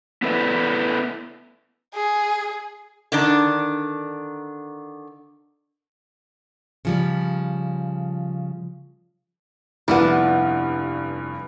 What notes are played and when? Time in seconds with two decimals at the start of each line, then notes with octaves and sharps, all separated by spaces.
0.22 B3 E4 A4 B4 D5 E5
1.94 G#4
3.12 D3 D#3 D4
6.85 C#3 F3 G3
9.88 F1 G2 B3 D4 E4